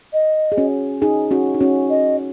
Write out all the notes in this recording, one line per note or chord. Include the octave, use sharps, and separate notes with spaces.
D#5
G#4
C#4 F#4
D#4 G#4
C#4 F#4
D#4
C#4 F#4
D#5